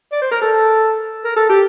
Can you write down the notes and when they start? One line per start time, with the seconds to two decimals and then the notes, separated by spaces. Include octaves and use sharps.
0.12 D5
0.22 C5
0.31 A#4
0.41 A4
1.24 A#4
1.36 A4
1.49 G4